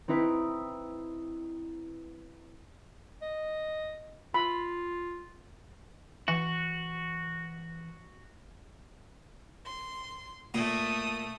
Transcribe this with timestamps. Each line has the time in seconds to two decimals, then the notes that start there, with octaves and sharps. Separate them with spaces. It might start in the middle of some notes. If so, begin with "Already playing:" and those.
0.08 C4 D#4 E4 B4
3.22 D#5
4.34 F4 B5
6.28 E3 F#4
9.66 C6
10.54 A#2 A3 A#3 D#6